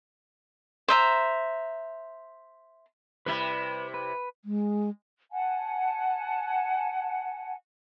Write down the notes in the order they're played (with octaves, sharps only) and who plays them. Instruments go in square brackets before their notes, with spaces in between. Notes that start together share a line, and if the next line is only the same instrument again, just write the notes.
[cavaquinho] C5 E5 A#5
[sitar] C3 G3 E4 [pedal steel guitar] B4 B5
[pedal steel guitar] B4
[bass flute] G#3
[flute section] F#5 G#5 A5